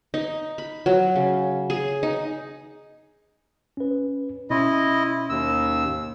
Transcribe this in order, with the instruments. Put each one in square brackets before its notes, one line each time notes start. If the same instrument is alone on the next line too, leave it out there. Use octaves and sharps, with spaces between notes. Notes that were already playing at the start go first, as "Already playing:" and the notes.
[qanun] D#4
B5
F#3
C#3
G#4
D#4
[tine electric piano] C#4 B4
[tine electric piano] B2 C#4 C6 [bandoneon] E4 D#5
[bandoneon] D#2 E6